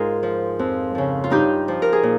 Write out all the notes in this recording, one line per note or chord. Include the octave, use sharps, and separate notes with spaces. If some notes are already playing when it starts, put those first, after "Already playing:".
Already playing: G#2 F4 G#4 A#4
F3
F2
C#3 F3
F4
G2 D#4 G4
F3
A#4
G#4
A#2